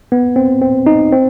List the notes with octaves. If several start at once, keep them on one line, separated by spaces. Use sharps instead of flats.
B3
C4
C4
D#4
C4